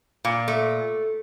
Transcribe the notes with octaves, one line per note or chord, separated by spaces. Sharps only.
A#2
A3